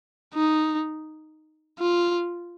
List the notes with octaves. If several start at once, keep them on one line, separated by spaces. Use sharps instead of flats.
D#4
F4